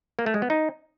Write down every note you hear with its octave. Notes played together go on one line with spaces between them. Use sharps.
A#3
A3
G#3
B3
D#4